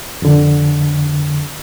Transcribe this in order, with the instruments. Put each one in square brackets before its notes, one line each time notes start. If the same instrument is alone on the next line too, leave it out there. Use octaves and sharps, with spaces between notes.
[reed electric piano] F2 D3